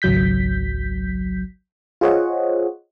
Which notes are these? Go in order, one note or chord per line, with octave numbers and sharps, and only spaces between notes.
G#1 C#2 F#3 G6 B6
F4 G#4 C5 C#5 D#5 F#5